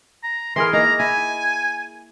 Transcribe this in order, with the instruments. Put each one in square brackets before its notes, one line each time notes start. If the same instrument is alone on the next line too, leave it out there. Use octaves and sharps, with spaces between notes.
[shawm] A#5
[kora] E3 G#4 A#4 [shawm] C6
[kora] A#3 D#4 [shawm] A#5
[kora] E4 [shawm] G#5